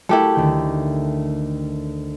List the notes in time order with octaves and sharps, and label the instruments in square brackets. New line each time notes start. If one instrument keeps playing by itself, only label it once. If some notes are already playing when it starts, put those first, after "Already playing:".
[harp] A3 F#4 A#4 [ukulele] E4 G4 A4
[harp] D2 D#3 G5